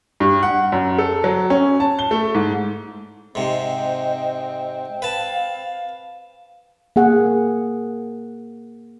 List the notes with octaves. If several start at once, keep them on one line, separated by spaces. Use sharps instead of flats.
G2
F#5
F#2
A4
F#3
C#4
A5
G7
A3
G#2
G#2 C3 C4 D#5
B4 F5 A5
A#3 G#4 F#5